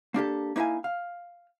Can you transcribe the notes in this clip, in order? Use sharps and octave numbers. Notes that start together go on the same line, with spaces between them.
A#3 D4 G4 A4
A#3 D#4 E4 F5 G#5
F5